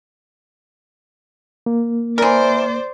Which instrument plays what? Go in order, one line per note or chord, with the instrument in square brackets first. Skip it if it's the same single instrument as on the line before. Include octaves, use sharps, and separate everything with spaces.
[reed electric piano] A#3
[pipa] E3 A#4 [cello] C5 D5